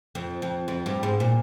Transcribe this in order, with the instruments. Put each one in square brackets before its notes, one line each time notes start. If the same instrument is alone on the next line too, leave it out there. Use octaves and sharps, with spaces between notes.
[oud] F2
F2
F2
G2
G#2
A#2